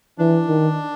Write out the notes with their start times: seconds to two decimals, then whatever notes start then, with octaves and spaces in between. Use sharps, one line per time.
0.18 E3 D4
0.48 D#3